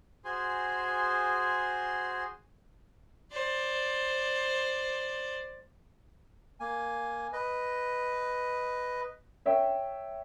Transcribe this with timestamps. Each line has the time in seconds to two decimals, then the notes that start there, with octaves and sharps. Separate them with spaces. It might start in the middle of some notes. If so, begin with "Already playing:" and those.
0.25 F#4 G#4 C5 G#5 C6
3.32 C5 D5
6.60 A#3 G#5
7.33 B4 D#5
9.46 C#5 E5 G5